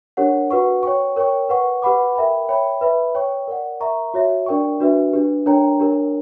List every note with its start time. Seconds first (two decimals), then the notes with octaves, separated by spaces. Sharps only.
0.17 D4 G4 A#4 C#5 F#5
0.51 F#4 B4 F#5 C#6
0.83 C#5 G5 C#6
1.16 A#4 C#5 G5 C#6
1.49 B4 F#5 C#6
1.82 G4 B4 F#5 B5 D6
2.15 A#4 E5 G5 B5
2.49 C#5 E5 G5 B5
2.81 B4 E5 B5
3.15 C#5 G5 C#6
3.47 A#4 D5 F#5
3.80 A#4 E5 A#5 C#6
4.14 F#4 C#5 E5
4.46 D4 A#4 D5 G5 C#6
4.80 D4 F#4 B4 E5
5.13 D4 G4 B4
5.46 D4 A#4 C#5 G5 A#5
5.79 D4 G4 A#4 C#5